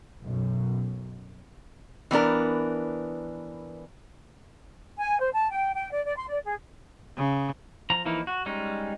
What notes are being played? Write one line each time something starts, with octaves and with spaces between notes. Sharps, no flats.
B1 F#2
E3 B3 D4 A#4
G#5
C5
A5
G5
G5
D5
D5
C6
D5
G#4
C#3
F3 A#5
E3 F3 A#3 D#4 E4
F#4
G3 G#3 C#4 D#4